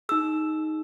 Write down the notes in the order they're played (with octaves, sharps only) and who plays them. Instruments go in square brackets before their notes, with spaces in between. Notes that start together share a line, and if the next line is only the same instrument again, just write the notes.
[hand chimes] D#4 G#4 E6